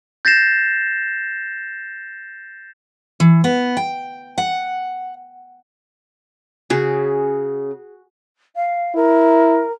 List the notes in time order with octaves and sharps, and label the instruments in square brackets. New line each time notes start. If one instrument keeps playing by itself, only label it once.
[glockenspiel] G6 A6 A#6 C7 E7
[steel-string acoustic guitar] E3
B3
G5
F#5
[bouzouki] C#3 [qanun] F#4 G#4
[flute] F5
[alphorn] E4 [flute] A#4